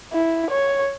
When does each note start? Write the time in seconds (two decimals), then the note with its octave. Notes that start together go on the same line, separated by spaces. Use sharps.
0.13 E4
0.50 C#5